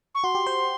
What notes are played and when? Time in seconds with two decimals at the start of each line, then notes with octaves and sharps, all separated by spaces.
0.15 C#6
0.24 F#4 C6
0.35 G4
0.47 C5